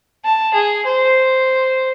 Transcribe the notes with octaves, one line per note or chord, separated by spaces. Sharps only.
A5
G#4
C5